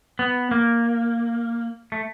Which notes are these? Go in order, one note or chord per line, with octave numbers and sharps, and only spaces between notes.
B3
A#3
A3